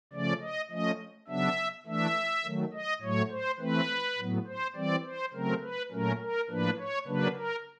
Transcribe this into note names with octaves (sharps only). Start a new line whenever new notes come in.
C#3 F3 A3 C#4 D5
D#5
F3 A3 C#4 D#5
C#3 F#3 B3 D4 E5
E3 A3 D4 E5
D#3 F#3 A3
D#5
A2 F#3 A3 C#5
C5
E3 A3 C4 B4
A2 F#3 B3
C5
E3 G3 C4 D5
C5
C#3 F#3 A3 C4 A#4
B4
A#2 F#3 A3 C#4 A#4
A#4
A2 F3 A#3 D4 B4
C#5
C#3 F#3 A#3 D4 B4
A#4